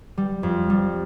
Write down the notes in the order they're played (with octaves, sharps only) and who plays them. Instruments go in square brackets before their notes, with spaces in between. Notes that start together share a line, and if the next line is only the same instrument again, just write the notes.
[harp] G3
F2
G3